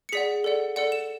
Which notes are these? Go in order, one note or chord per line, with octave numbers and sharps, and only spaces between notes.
C#7
G#4 D5 F#5 B6
A4 D5 F#5
A4 D5 F#5 C#7
E7